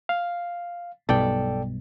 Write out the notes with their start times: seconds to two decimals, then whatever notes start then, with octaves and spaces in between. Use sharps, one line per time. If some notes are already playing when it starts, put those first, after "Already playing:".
0.09 F5
1.09 B1 G2 B2 A4 D5 G5